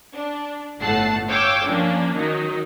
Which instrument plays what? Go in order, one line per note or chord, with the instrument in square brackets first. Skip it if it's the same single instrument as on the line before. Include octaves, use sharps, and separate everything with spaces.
[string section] D4
G1 A2 A3 F#5 A5 C7
C#5 F5 G5 D6 E6
F3 A#3 C#4 D4
D#3 F#3 D#4